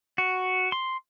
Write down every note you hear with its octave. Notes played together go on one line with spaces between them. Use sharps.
F#4
C6